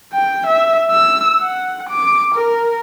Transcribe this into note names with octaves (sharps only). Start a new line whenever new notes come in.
G5
E5
E6
F#5
D6
A#4